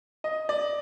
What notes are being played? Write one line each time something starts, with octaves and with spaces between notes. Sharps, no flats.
D#5
D5